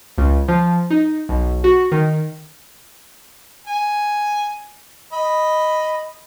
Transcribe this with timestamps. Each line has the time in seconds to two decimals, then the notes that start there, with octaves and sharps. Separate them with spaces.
0.18 C#2
0.48 F3
0.90 D#4
1.29 B1
1.64 F#4
1.92 D#3
3.67 G#5
5.13 D#5 B5